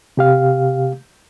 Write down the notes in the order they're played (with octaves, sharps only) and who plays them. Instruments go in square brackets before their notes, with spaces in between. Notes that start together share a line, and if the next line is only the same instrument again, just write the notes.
[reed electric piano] C3 G4 F5